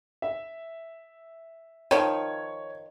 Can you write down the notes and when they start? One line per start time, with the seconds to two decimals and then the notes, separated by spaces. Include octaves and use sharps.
0.22 E5
1.91 D#3 F3 C#5